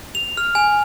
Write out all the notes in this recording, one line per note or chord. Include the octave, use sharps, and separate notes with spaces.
F7
F6
G#5